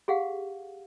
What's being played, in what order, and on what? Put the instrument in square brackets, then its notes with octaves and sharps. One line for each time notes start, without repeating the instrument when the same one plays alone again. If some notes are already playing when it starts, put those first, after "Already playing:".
[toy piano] G4 G#4 F5 F#5